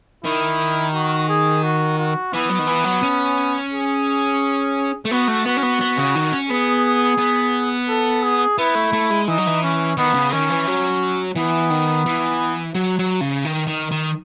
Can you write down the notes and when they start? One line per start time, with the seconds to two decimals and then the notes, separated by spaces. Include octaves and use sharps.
0.24 D#3 E4
0.94 F#4
1.28 G#4
1.63 F#4
1.98 F#4
2.33 E3 B3
2.49 F#3
2.59 D#3
2.67 E3
2.84 F#3
3.03 C#4
3.72 G#4
5.05 A3
5.11 B3 F#4
5.28 A3
5.45 B3 F#4
5.57 C#4
5.63 B3
5.81 B3
5.97 C#3
6.15 D#3
6.32 C#4
6.50 B3 G#4
7.18 B3
7.88 A4
8.23 G#4
8.58 B3 E4
8.75 A3
8.93 A3
9.11 G#3
9.28 E3 D#4
9.38 F#3
9.47 E3
9.63 C#4
9.97 D#3 B3
10.14 C#3
10.31 D#3 C#4
10.50 E3
10.67 F#3
11.35 E3 B3
11.70 D#3
12.06 E3
12.75 F#3
12.99 F#3
13.21 C#3
13.45 D#3
13.67 D#3
13.91 D#3